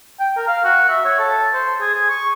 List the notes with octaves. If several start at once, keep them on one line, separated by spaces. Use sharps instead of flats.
G5
A#4
F5
F#4
E5
C#5
A4
C5
G#4
G#4
C#6